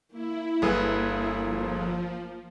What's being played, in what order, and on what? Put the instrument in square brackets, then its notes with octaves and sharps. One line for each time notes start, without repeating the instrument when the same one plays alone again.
[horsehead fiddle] A#3 [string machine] E4
[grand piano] G1 G#4 B4 [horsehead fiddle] A#3
[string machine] F3